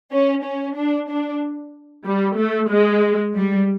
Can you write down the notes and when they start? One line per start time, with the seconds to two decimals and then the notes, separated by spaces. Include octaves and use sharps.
0.12 C#4
0.44 C#4
0.76 D4
1.09 D4
2.05 G3
2.37 A3
2.70 G#3
3.34 G3